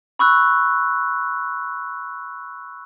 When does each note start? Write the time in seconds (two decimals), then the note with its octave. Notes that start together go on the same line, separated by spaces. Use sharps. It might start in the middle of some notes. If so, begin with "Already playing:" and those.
0.19 B5 C#6 E6 F#6